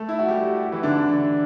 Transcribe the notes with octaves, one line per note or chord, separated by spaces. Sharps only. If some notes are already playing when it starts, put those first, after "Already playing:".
Already playing: A3 A4
E4
F#4
G3 G4
E3 E4
D3 D4